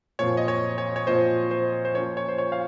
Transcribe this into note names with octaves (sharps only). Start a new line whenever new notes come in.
A#2 F3 C4 F4 C#5
D#5
C#5
C#5
C#5
A#2 F3 C4 F4 C5 D#5
C5
C5
F3 A#3 C#4 F4 C#5
C#5
C5
C#5
F5